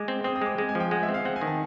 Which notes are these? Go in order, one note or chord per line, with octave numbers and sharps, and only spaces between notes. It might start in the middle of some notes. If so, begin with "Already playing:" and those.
Already playing: G#3 D6
C4
C4 D#6
D#6
G#3 D6
G#3
G#5
F3
G5
G#3 F#5
E5
C4
F5
C4 F#5
G#5
D#3
A5